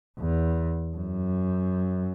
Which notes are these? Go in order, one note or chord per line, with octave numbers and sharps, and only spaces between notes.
E2
F#2